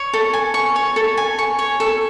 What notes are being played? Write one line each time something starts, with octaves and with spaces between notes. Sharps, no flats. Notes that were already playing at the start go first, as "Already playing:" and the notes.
Already playing: C#5
A4
G#5
C#6
C#5
A4
G#5
C#6
C#5
A4